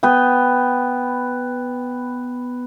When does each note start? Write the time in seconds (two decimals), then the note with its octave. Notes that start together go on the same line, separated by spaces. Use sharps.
0.03 B3 G5